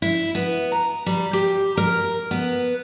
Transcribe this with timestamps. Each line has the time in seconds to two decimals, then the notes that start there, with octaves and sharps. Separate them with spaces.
0.02 E4
0.35 B3
0.72 A#5
1.06 G3
1.33 G4
1.77 A#4
2.31 B3